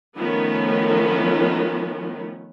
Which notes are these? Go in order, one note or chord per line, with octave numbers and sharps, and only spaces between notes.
D#3 F3 A3 B3 C#4